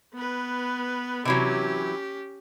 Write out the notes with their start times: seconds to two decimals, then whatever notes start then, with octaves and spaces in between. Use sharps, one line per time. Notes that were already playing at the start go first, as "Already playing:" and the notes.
0.14 B3 B4
1.25 C3 E3 F#3 C#4 G4